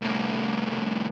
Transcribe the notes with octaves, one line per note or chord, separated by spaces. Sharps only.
C2 A2